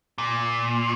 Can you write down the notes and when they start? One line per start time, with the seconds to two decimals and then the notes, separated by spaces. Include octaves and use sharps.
0.18 A#2